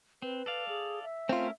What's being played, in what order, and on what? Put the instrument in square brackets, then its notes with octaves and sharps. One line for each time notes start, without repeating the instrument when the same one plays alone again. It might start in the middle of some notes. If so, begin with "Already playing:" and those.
[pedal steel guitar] C4 [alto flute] B4
[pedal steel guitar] A4 D5 F5
[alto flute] G#4
E5
[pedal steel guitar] A3 C#4 A#4 [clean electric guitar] C4 F4